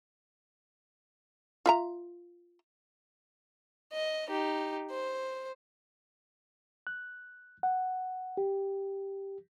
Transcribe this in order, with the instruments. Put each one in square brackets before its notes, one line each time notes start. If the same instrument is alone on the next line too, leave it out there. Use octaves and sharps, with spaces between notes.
[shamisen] F4 E5 A#5
[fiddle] D#5
D#4 G4
C5
[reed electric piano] F#6
F#5
G4